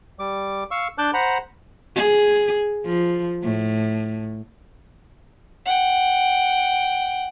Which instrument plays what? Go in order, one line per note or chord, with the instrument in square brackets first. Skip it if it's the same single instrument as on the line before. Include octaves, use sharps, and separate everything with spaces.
[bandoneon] G3 D6
F5 C#6 E6
D4 A5 D6 F#6 G6
C5 F#5 A#5 B5
[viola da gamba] G#4
F3
A2
[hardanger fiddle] F#5 G5